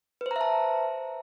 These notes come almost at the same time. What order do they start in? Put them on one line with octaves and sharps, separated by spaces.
B4 C5 A#5 E5 A5